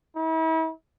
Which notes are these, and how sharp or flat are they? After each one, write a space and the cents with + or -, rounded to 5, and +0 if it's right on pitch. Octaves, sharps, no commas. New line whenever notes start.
E4 -40